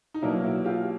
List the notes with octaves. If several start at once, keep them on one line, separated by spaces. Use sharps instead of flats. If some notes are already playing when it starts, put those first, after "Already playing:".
D#4
B2 F#3 A#3 D4 E4
E4 F#4
F4 G4